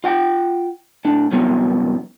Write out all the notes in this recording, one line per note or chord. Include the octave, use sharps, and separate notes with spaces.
F4 F#5 G5
A2 D4
C2 F#2 E3 F#3 B3